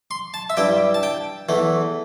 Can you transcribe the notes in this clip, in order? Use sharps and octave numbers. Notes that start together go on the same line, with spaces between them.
C6
A5
E5
G2 G3 E4 G5
A5
G5
E2 E3 A3